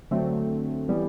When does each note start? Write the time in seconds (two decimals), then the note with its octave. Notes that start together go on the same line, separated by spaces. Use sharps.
0.11 D3 F#3 A3 C4
0.88 E3 G3 B3